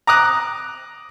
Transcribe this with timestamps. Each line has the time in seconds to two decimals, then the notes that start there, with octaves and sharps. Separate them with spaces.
0.07 A#5 D6 D#6 F#6